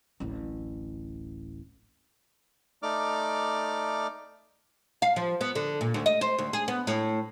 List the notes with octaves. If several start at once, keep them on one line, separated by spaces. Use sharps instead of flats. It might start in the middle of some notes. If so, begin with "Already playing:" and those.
D1 A1
A3 D#4 D5 D6 F6
F5
F3
B3
D3
A#2
D2
D#5
C5
D2
G#4
B3
A2